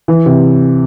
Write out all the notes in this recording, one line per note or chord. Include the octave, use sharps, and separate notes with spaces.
E3
C3